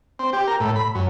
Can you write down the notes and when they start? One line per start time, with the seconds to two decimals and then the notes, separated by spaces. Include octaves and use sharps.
0.19 C4
0.33 G4
0.47 A#4
0.60 A2
0.76 B5
0.95 F#2